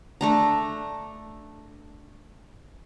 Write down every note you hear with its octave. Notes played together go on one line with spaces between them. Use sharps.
A3 D4 A#5